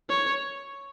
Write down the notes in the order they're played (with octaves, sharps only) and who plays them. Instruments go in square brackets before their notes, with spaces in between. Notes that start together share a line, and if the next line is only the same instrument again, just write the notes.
[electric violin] C#5